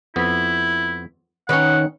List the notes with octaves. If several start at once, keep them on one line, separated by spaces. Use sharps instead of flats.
F2 B3 E4
D#3 C#4 B4 C#5 F#5